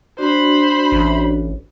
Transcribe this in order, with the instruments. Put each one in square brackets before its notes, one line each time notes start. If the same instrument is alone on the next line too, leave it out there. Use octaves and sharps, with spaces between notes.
[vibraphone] D4 F#4 D5 [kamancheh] C5 B5
[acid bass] A1